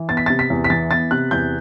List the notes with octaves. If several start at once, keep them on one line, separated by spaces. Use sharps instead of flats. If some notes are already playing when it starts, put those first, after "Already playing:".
Already playing: E3
B3 A6
B6
C3 A6
B6
E2
B6
E3 A6
B3 A6
C3 F#6
E2 G6